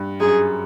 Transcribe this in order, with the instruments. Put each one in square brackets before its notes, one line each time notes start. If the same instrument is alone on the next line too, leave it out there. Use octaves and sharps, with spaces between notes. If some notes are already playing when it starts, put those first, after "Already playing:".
Already playing: [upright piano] G2
[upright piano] F#2 [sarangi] G#4